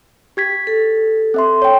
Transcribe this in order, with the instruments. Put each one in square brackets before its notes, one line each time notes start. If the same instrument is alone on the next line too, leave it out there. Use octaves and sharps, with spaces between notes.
[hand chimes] G4 G#6 B6
[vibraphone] A4
[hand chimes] C4 E5 C6
C#5 G5